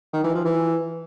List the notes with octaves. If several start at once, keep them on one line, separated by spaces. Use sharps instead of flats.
D#3
E3
F3
E3